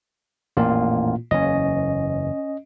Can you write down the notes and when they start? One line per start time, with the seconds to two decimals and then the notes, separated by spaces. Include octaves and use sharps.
0.57 A1 F2 A#2 A#3 F4
1.31 F#1 E2 C#4 D#5